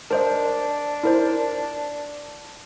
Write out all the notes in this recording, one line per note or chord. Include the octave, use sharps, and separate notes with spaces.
D4 A#4 C5 D#5
E4 A#4 C5